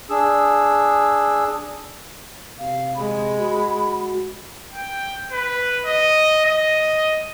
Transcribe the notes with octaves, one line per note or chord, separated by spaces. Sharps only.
D4 G#4 E6
C3 F5
G#3 B5
F#4
G5
B4
D#5
D#5